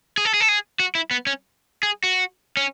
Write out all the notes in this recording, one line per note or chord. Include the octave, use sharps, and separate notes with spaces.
G#4
A4
G#4
A4
G#4
F#4
E4
B3
C#4
G#4
F#4
C#4